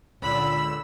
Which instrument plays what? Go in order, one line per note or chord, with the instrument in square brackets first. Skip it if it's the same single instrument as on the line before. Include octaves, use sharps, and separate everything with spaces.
[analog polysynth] C#2 D3 E6 [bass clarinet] A#2 [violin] B5